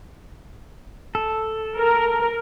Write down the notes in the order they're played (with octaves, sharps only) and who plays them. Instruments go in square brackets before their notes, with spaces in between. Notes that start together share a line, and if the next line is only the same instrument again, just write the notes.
[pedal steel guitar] A4
[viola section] A#4